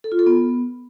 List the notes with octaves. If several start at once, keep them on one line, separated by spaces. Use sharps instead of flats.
A4
F4
A4
B3